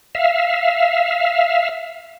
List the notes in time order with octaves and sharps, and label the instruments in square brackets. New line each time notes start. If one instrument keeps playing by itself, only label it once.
[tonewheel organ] E5 F5